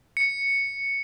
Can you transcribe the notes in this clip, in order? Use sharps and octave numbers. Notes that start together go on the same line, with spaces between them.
C#7